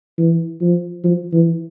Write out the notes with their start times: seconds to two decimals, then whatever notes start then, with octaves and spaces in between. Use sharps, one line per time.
0.18 E3
0.61 F3
1.04 F3
1.33 E3